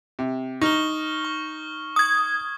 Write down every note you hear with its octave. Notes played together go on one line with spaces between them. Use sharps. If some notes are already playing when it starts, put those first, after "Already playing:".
C3
D#4 C#6 F6 G7
C#6
D#6 G#6